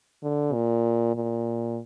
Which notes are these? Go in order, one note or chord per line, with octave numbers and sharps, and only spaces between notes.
D3
A#2
A#2